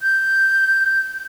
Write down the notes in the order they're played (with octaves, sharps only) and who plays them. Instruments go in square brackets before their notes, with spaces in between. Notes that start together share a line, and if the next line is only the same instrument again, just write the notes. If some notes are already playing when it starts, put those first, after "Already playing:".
[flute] G6